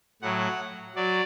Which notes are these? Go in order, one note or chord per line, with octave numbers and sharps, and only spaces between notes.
A2 F#3 F#5
F#3 D5